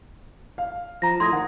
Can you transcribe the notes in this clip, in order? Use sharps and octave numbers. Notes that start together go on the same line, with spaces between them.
F5
F3 A#5 A#6
A2 C6 D#6 G#6 A#6
D#3 F#5